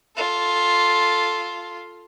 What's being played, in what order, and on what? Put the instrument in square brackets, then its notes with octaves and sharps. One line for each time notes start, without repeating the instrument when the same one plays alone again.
[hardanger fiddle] F4 A4